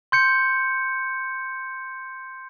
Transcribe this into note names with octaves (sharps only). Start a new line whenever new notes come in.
C6 G6 C#7